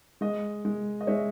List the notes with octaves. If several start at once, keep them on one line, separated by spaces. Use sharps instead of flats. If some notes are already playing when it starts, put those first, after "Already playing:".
G#3 D#5
G#3
D#5
G#3 C#5 E5